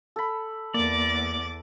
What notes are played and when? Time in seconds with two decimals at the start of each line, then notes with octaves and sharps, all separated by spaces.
0.16 A4 B5
0.74 E2 A#3 D5 D6 A6